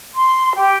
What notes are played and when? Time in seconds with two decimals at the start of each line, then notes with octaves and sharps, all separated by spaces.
0.14 C6
0.55 G4